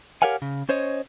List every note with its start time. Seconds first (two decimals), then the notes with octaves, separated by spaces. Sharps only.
0.22 G4 A#4 C#5 F5 F#5 G#5
0.42 C#3
0.69 C#4 C5 C#5 D#5